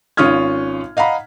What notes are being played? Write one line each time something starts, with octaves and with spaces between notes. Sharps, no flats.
G#1 C#4 F4 D#6 F6 G#6
D#5 F5 F#5 A#5 B5